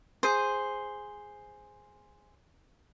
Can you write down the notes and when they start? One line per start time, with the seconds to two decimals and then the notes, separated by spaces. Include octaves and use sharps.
0.23 G#4 C5